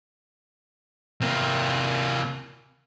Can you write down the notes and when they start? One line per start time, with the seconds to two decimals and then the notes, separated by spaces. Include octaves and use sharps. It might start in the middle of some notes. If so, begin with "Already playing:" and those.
1.21 C3 A#3